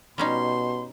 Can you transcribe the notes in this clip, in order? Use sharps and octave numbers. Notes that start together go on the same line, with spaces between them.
B2 G3 C#4 D#4 C6